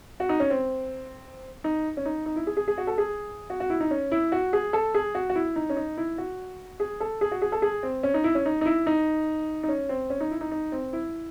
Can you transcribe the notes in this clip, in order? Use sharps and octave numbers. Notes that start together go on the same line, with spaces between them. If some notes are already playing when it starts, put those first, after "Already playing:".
F#4
D#4
C#4
C4
D#4
C#4
D#4
D#4
E4
G#4
G#4
G#4
F#4
A4
G#4
F#4
F#4
E4
D#4
C#4
E4
F#4
G#4
A4
G#4
F#4
F#4
E4
D#4
C#4
D#4
E4
F#4
G#4
A4
G#4
F#4
G#4
A4
G#4
C4
C#4
D#4
E4
C#4
D#4
D#4
E4
D#4
D#4
C#4
C4
C#4
D#4
E4
D#4
D#4
C4
E4